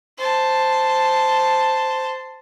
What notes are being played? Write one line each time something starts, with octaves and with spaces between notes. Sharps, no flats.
C5 A5